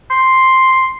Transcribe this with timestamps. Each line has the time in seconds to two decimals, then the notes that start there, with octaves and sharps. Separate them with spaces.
0.10 C6